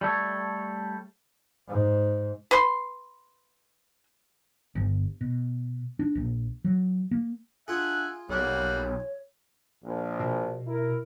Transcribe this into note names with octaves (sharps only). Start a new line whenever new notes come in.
G3 A3 A4 C#5
G#2
B4 C6
G1
B2
D4
A#1
F#3
A#3
D4 F4 G#4 E5 F#5 G#5
B1 G3 A#3 C#5 F#5
A#1
B2
E4 A#4